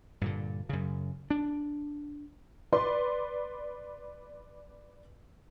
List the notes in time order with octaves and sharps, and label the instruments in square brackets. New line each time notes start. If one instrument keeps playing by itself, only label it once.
[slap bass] G2 A#2 D3
F#2 C#3
D4
[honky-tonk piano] B4 D5 C6